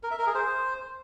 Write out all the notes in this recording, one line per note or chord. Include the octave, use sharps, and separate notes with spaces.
A#4
E5
A#4
G#4
C5